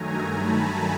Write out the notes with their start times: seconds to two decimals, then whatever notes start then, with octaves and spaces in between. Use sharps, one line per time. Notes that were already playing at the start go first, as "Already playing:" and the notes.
Already playing: G2 D#3 F#3 A3 G#5 A#5
0.33 A5 B5